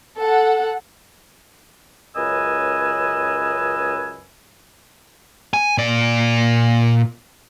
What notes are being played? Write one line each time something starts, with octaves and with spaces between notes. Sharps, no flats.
A4 F#5
C#2 F#2 B4 D#5 G#5 E6
G#5
A#2 D5